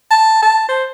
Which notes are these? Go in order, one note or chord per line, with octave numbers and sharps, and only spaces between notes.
A5
A5
C5